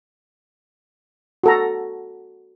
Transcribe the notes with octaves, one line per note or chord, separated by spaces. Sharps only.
F#4 A4 A#5